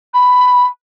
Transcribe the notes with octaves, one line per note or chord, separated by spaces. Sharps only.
B5